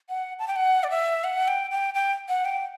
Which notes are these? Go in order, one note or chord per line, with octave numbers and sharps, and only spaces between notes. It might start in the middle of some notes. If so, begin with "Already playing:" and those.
F#5
A5
G5
F#5
D5
E5
F#5
G5
G5
G5
F#5
G5